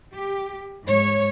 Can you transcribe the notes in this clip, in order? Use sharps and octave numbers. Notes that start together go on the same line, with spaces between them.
G4
G#2 C#5